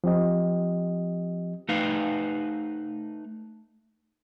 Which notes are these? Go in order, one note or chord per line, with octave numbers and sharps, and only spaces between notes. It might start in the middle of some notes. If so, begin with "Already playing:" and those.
F3 C4 G4 D#5
A3 D#4 B4 F5